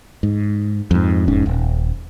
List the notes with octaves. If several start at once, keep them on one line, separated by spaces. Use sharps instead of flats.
G#2
F2 G#2
E1 G#2 C#4
D#1